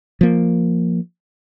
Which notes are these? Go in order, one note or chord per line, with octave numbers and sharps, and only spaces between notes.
F3 A#3